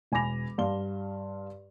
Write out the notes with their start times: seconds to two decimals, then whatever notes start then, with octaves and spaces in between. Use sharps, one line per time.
0.12 E1 G#5 B5 D6 A#6 F7
0.58 G2 F5 C6 G7